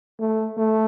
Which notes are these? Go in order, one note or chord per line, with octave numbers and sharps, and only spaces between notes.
A3
A3